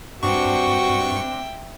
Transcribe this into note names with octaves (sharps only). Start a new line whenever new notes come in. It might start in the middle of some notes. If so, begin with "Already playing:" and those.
G2 C4 D4 F#4 E5 G5 C#6